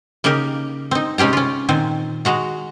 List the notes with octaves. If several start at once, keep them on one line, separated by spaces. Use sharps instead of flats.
C#3 A#3 D#4 G4 A#4
C4 D#4
C3 G#3 C#4 G4 A#5
C#4 F4
A#2 D#3 C4
G#3 F#4 A#5